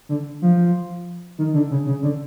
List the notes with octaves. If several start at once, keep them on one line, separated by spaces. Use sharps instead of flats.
D3
F3
D#3
D3
C#3
C#3
D3